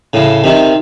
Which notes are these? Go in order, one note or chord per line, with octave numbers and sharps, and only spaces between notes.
A2 C#3
C3 D#3